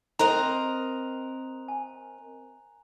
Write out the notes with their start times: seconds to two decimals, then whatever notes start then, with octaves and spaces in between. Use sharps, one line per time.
0.19 C4 A#4 D#5 A#5 F#6 F7
1.68 G#5